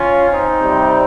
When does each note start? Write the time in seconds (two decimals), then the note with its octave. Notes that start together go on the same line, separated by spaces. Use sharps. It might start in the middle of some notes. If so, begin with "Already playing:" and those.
Already playing: C#4 F4
0.29 C4 D#4
0.58 C3 G3